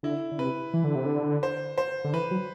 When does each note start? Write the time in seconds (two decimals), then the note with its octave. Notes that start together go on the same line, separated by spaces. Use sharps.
0.03 D3 E4
0.31 D3
0.38 C3 B4
0.74 E3
0.84 D3
0.95 C3
1.06 D3
1.43 C5
1.78 C5
2.04 D3
2.13 E3 B4
2.31 F#3